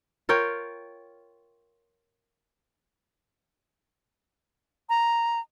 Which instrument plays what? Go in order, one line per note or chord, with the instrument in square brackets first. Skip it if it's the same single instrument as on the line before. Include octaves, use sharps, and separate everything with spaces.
[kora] F4 A#4 C#5 G5
[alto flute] A#5